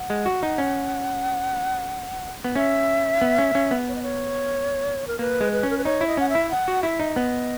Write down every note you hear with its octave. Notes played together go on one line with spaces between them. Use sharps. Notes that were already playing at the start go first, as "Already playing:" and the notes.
Already playing: F#5
G#3
F#4
D#4
C#4
B3
C#4 E5
B3
C#4
C#4
B3
C#5
D#5
C#5
A#4
A#3 B4
G#3
B4
C#4
A#4
B4
D#4 C#5
E4
D#5
C#4 F#5
E5
E4
F#5
F#4
E4 E5
D#4
B3 D#5